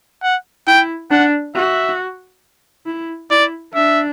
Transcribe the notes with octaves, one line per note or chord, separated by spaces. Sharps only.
F#5
E4 G5
D4 F#5
F#4 E5
E4
E4 D5
D4 E5